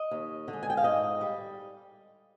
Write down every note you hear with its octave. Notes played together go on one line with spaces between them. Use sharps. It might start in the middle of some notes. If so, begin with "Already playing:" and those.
Already playing: D#5
D#2
D3
G#3
G#5
G5
F5
G#2 D#5
G3